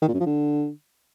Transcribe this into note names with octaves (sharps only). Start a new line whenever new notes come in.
D#3
A#2
F#2
F3
D3